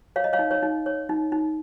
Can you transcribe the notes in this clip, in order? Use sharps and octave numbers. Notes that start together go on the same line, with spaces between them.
C#5 F5
D#5
C#5 F5
D#4
C#5
D#4
C#5
D#4
D#4